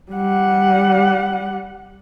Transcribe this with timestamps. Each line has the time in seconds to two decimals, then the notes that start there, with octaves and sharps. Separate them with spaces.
0.12 G3 F#5